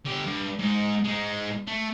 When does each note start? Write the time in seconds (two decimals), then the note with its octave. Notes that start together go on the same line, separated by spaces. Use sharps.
0.05 D3 G4
0.26 G2
0.59 G#2 D#4
1.04 G#3 D#4
1.67 A3